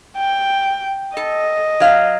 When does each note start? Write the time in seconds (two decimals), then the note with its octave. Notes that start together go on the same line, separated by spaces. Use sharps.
0.18 G5
1.17 A4 D#5
1.80 F#3 F5